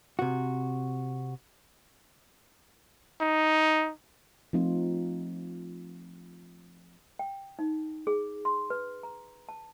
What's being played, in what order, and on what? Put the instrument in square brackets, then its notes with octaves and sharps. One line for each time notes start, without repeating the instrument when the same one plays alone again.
[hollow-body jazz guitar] C3 F#4
[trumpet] D#4
[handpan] F3 A3 C4 D#4 F4
[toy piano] G5
D#4
G#4
C6
B4
A#5
A5